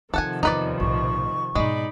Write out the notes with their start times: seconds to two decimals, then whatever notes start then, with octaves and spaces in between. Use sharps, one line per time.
0.14 C3 D#3 F3 C4 D#4 A4 F#5 G#5
0.43 E2 B3 D#4 B4 D5
0.80 B1 A2 C#6
1.55 G#2 B2 G#3 D#4 D5 B5